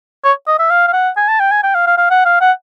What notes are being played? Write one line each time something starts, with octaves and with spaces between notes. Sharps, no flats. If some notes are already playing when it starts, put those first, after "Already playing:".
C#5
D#5
E5
F5
F5
F#5
G#5
A5
G5
G#5
G5
F5
F5
F5
F#5
F5
F#5